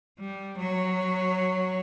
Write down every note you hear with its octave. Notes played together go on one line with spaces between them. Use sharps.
G3
F#3 C#5